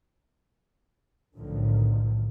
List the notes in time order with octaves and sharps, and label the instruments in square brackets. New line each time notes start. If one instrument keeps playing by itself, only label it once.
[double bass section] B1 F#2 A2 D3 D#3 F3